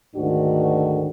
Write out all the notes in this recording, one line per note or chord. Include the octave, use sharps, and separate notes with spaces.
D2 G#2 D3 D#3 D4 F#4